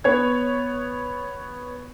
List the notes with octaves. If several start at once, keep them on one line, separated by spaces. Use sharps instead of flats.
B3 C#5 G#6